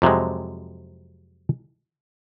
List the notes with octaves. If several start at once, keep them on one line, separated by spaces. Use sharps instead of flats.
F2 C3 F#3 G#3